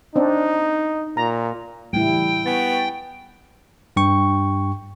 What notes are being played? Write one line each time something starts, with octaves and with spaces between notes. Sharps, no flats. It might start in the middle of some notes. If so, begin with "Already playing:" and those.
C4 D4 D#4
A#2 A#5
A2 C#3 E3 G3 E4 G5
B3 G#5 C#6 A6
G2 G5 C#6